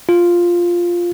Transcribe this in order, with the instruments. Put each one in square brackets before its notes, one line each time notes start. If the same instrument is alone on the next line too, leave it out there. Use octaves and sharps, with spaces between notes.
[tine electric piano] F4